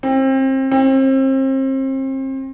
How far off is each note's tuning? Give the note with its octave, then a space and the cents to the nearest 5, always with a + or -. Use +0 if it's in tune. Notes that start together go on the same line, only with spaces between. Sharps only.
C4 +30
C4 +35